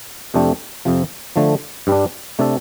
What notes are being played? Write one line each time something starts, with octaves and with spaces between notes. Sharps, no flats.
F2 C3 A3 D4 G4
F2 C3 F3
D3 F3 A3
G2 G3 D4
C3 A3 D4 A4